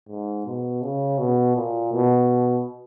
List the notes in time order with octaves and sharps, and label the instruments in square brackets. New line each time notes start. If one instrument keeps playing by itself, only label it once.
[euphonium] G#2
B2
C#3
B2
A#2
B2